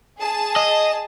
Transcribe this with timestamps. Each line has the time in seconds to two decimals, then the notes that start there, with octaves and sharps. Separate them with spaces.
0.19 G#4 A5
0.56 D#5